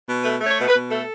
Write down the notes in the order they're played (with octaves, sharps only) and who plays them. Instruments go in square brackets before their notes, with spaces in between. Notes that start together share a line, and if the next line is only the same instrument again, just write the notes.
[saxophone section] B2
A3 B4
A3
C#5
B2
B4
B2
A3 A4